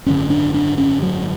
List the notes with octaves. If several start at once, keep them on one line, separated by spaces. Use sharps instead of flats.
G#1 F#2 D3 C#4
D4
D4
C#4
F#3